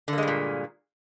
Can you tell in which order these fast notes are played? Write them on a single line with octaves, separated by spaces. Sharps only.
D3 A#3 G#3 G2 A#2